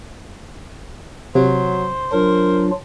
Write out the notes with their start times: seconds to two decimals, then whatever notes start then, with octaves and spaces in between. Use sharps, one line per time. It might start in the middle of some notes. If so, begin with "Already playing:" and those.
1.35 C3 F#3 C5
2.12 F#3 D4 F4 A#4